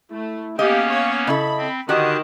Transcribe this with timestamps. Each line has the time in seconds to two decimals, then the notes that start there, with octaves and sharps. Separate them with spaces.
0.11 A3 E4
0.59 A#3 B3 C#4 G4 D#5 F5
0.89 C#5
1.27 C#3 E4 A4 D#5 B5
1.57 C4
1.89 D3 D#3 F#4 G4 D#5 A5